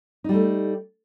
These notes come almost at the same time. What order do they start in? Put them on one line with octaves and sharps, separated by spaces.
D#4 G3 A3